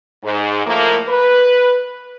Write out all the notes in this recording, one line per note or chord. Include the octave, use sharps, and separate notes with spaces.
G#2
A2 F3 A3 A#3
B4